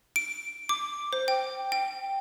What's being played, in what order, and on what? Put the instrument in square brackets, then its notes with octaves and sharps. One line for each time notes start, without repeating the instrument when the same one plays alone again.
[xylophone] D7
D6
C5
G5
G5